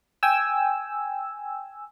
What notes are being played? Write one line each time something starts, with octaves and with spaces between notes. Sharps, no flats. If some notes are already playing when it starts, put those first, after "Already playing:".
G5 G#5 E6